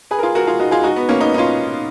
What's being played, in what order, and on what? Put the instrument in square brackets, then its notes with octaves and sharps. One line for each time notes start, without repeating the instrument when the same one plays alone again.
[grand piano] G#4 B4
A#4
F4 G#4
F#4 A#4
F4 G#4
D#4 F#4
F4 G#4
D#4 F#4
B3
A#3 C#4
B3 D#4
D#4
C#4 F4